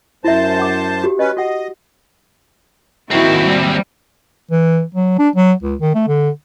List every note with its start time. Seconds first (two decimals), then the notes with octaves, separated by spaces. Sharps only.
0.24 F#2 E4 C5 E5 A5
0.59 F#5 D6
1.04 F#4 G4
1.19 C#4 B4 D#5
1.37 F#4 D#5 F#5
3.11 D#2 D#3 C4 E4 F#4
3.45 G3
4.51 E3
4.95 F#3
5.19 D4
5.36 F#3
5.63 C#2
5.81 D#3
5.95 A3
6.08 D3